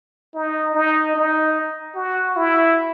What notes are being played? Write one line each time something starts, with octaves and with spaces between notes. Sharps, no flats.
D#4
D#4
D#4
F#4
E4